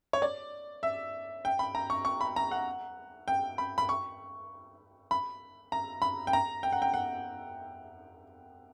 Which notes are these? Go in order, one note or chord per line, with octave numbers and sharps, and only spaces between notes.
C#5
D5
E5
G5
B5
A#5
C#6
C#6
B5
A#5
F#5
G5
B5
B5
C#6
B5
A#5
B5
G5
A#5
G5
F#5
G5
F#5